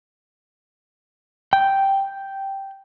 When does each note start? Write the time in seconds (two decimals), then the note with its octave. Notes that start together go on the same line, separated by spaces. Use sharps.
1.53 G5